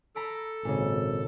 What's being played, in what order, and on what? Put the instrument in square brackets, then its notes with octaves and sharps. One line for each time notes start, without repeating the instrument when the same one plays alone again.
[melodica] A4 [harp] A#5 B5 D7
[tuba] G#1 [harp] A#2 C#3